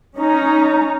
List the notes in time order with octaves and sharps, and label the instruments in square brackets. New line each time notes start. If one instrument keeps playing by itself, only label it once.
[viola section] C#4 D#4 A#5